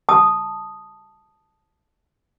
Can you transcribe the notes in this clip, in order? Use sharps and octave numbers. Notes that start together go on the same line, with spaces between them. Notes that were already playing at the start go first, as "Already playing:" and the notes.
A5 D#6